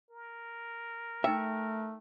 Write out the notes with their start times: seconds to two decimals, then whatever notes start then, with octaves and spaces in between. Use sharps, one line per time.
0.10 A#4
1.24 A3 D#4 E5 G5